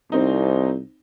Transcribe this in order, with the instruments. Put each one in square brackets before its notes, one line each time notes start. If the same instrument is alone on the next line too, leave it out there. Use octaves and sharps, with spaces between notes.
[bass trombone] C2 [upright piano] C4 D#4